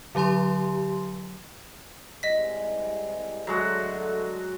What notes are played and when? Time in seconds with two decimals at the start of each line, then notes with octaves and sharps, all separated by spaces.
0.15 D3 F#3 G4 A#5 C6
2.23 C2 G#3 D#5 B6
3.47 D3 F#3 G#3 A3 F#4 A4